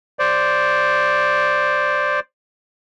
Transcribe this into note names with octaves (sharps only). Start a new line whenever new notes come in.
C5 D5